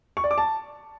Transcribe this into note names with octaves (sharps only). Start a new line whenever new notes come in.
C#6
D5
D6
A5